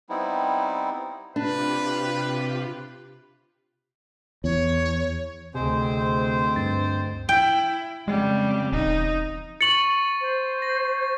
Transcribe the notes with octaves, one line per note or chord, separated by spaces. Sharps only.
G3 B3 C4 D#4 E4
C3 D4 F4 G4 B4
E2 C#5
D2 C3 C4 G#4 C5 D#5
G2 A6
E4 G5
F2 C#3 G3 G#3
E1 D#4
C#6 A6 C#7 F#7
C5
A#6